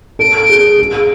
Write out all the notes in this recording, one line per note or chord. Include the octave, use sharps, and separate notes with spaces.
A4 D7
G#4
G#4